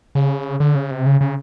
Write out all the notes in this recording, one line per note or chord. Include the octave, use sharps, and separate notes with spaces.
C#3
D3
C#3
C3
C#3
C#3